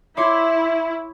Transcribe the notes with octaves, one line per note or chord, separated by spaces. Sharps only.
E4 C#5 E5 C6 D6